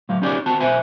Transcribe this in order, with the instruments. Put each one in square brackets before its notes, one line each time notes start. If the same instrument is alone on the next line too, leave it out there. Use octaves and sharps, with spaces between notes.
[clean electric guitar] A2 F#3 F5
C#4 D#4 G4 G#4 C#5 D5
C4 F#4 A5
B1 C5 E5 G#5